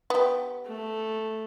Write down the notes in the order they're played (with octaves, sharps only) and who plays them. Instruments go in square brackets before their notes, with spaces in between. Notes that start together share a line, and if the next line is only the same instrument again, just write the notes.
[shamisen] B3 G4
[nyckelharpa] A3